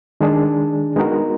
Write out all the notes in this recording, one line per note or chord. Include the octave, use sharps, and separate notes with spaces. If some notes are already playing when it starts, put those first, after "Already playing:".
D#3 G#3 D4 G#4
G#3 B3 D#4 F#4 A#4